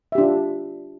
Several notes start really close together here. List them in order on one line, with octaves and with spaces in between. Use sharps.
E5 G4 D4 F4